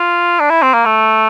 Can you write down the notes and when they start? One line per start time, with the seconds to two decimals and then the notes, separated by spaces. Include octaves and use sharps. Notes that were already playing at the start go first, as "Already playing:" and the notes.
Already playing: F4
0.40 D4
0.50 E4
0.62 C4
0.74 A#3
0.85 A3